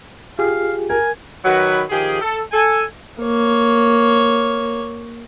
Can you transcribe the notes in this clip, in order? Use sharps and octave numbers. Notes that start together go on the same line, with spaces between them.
F4 G4 G#4 F5
A#4 G#5
D#3 F#3 F#4 B4
D#3 F3 G4 G#4
A4
A4 G#5
A#3 C#5